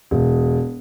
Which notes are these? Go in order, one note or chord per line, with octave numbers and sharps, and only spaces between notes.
E1